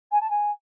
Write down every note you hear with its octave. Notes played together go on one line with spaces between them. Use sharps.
G#5
A5
G#5